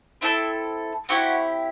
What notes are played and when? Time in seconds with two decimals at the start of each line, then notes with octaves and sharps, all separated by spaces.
0.21 C4 E4 A4 E5 E6
1.09 C4 E4 F#4 G4 F#5